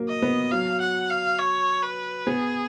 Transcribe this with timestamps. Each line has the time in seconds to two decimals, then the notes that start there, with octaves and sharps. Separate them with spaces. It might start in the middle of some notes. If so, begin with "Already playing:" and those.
Already playing: F#3 A#3
0.08 D#5
0.22 B3
0.52 F#3 F5
0.81 F#5
1.10 F5
1.39 C#5
1.83 B4
2.27 B3 G#4